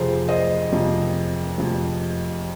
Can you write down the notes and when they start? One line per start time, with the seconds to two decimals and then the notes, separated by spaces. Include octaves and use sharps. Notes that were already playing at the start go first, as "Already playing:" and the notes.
Already playing: F2 C3 F3 G#4 C5
0.29 C5 D#5
0.72 F2 C3 F3
1.58 F2 C3 F3